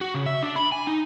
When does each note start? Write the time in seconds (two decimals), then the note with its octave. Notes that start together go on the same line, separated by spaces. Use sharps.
0.01 F#4
0.15 C#3
0.26 E5
0.43 D4
0.56 B5
0.72 G#5
0.87 D#4